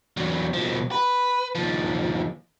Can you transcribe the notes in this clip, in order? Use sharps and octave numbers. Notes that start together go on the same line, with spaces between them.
E2 F#3
B2 F3
B4
D#2 F3